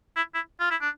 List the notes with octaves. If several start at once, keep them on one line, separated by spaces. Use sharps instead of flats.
E4
E4
F4
E4
D4